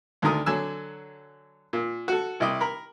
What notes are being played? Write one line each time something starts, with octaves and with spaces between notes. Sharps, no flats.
D2 D3 D#3 A#4 D#6
D3 F#3 G#5 E6
A#2
F#4 A4
C2 E4 D#5 D6
A#4 B5